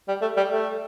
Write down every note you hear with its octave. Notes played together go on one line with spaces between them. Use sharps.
G3
A3
G3
A3